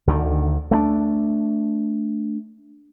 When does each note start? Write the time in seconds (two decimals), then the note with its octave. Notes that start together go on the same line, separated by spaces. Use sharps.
0.07 D2 D3 D#3
0.71 A3 B3 D4